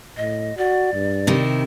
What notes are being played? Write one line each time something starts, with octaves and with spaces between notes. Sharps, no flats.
A2 D#5
F#4 D5
G2
C3 D#3 E4